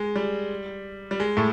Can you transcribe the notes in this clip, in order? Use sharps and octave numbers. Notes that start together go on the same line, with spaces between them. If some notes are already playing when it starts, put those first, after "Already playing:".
Already playing: G#3
G3
G3
G#3
A2 A3